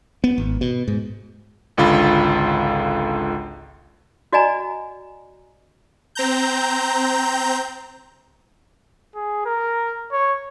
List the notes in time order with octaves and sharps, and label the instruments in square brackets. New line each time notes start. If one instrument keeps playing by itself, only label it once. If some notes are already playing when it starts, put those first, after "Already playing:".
[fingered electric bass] B3
G#1
B2
G#2
[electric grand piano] G#1 C#2 D3 F4 B5
[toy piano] F#4 D5 D#5 G#5 A#5
[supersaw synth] C4 A#5 G6
[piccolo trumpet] G#4
A#4
C#5